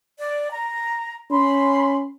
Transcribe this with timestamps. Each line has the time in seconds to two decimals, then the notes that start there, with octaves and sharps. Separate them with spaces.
0.19 D5
0.51 A#5
1.31 C#4 B5 C6